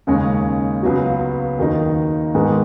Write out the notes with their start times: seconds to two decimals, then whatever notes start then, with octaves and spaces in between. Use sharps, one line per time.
0.07 D#2 C#3 G#3 C#4
0.83 C#2 C#3 F#3 B3 F#4
1.59 D#2 D#3 F#3 D#4
2.34 G#2 D#3 B3 G#4